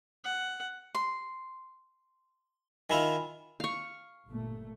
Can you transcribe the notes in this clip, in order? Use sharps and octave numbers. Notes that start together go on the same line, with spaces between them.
F#5
C6
D#3 E4 F4 G#5 B5
F5 C#6
G1 A#2 A3